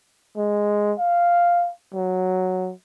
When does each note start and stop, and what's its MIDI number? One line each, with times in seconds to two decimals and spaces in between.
0.37 0.93 56
1.00 1.71 77
1.94 2.72 54